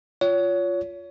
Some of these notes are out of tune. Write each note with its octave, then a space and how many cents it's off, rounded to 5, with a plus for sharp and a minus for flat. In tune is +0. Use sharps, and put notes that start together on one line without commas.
F4 +0 C#5 +25